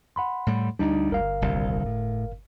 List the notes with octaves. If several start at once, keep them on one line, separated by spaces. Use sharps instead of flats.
F#5 B5 C6
A2 G3
D2 G3 D4 D#4
G1 A#4 F5
D#1 C2 D3
A2